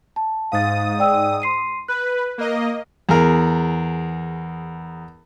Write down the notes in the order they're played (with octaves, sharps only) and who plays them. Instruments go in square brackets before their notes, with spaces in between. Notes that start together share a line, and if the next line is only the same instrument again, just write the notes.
[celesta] A5
[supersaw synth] G#2 D#6 [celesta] F5 A6
[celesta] D5 G5 E6
C6 C7 D#7
[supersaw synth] B4 [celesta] F#6
[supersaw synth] A#3 D#5
[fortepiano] E2 G#4 A#4